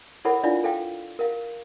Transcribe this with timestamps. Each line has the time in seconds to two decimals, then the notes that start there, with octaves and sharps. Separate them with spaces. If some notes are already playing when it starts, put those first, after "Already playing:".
0.25 E4 A4 A#4 C#5 F#5 B5
0.44 D4 E4 F4 D5 F5
0.64 A4 F5 G5
1.19 A#4 F5